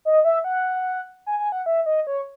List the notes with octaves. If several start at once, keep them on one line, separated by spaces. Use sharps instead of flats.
D#5
E5
F#5
G#5
G#5
F#5
E5
D#5
C#5